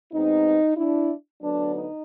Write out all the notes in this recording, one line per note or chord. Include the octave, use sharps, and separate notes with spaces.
B2 G#3 C4 D#4
D4 E4
D2 D3 F#3 B3 D4
D#4